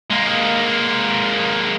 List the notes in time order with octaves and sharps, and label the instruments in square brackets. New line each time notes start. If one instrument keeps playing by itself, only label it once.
[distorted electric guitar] G#3 A#3